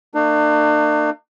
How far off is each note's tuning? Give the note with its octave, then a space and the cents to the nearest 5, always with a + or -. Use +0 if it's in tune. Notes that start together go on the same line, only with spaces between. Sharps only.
A#3 -45 D4 +40